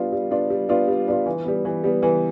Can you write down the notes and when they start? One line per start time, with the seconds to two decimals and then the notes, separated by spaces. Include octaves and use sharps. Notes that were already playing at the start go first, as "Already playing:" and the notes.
Already playing: G3 B3 D4 F4
0.12 G3
0.31 B3 D4 F4
0.50 G3
0.69 B3 D4 F4
0.88 G3
1.07 B3 D4 F4
1.26 E3
1.45 G3 B3
1.65 E3
1.84 G3 B3
2.03 E3